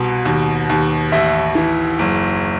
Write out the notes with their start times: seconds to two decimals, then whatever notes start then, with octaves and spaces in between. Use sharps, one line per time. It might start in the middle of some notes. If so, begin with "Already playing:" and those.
Already playing: C2 B2
0.25 D#2
0.69 D#2
1.12 A1 E5
1.55 E3
1.99 F#1